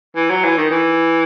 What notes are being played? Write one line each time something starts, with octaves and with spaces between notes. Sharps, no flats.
E3
F#3
E3
D#3
E3